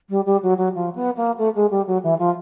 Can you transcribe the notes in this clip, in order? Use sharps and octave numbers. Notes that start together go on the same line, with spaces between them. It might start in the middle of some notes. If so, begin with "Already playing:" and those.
G3
G3
F#3
F#3
F3
B3
A#3
A3
G#3
G3
F#3
E3
F3